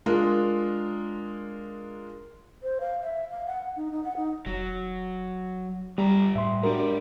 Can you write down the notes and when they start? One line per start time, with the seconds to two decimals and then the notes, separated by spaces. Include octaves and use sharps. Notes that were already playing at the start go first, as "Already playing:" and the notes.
0.06 G#3 D4 F4 G#4 A#4
2.62 C5
2.80 F5
3.02 E5
3.30 F5
3.46 F#5
3.76 D#4
3.91 D#4
4.04 F#5
4.16 D#4
4.46 F1 F#3
5.98 G2 G3 A#5
6.36 A2 E5 C6
6.63 G#3 D4 F#4 G4 A#4